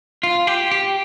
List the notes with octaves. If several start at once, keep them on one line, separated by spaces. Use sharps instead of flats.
F4
G4
G4